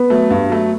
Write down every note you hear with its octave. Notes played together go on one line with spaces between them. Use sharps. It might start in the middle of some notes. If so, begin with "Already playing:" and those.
Already playing: B3
F#3 A3
G2
F#3 A3